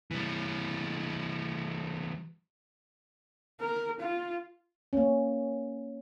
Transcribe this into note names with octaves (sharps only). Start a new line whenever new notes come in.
E3 G3
A#4
F4
A#3 C#4